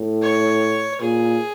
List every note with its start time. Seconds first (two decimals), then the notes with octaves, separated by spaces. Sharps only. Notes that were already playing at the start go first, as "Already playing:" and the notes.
Already playing: A2
0.23 C#5
1.01 A#2 G#4